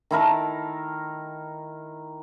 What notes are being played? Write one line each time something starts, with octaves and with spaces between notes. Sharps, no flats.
D#3 E4 A#4 A5